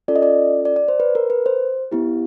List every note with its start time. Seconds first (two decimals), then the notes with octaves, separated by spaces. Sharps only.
0.08 C#4 F4 A4 D5
0.16 D#5
0.22 D5
0.65 D5
0.76 D5
0.88 C5
1.00 B4
1.15 A#4
1.30 B4
1.46 C5
1.92 B3 E4 G4